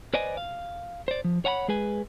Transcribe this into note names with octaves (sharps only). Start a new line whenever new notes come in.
B4 C5 D5 D#5 G#5
F5
C5 D5
F3
C#5 F#5 G#5 B5
G#3 G#4 B4 G#5